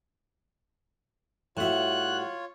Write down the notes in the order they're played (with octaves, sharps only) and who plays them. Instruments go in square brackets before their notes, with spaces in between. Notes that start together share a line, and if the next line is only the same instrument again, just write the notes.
[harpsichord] A2 E5 [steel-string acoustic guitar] G3 F#4 [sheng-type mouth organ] F4 C#5 [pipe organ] F#6